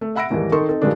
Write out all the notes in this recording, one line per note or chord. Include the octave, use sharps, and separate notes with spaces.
A3
E5 F#5 B5 E6 A#6 D7
D#2 G#2 E3 G3 A#3
D#3 D#4 A4 D#5 C6 C#6
C4 D#4 A4
G2 D#3 F3 G#3 A3 D4